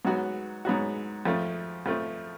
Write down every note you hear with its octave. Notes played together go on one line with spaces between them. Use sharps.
G#2 F#3 B3 F#4
G#2 F#3 B3 F#4
F2 F3 A3
F2 F3 A3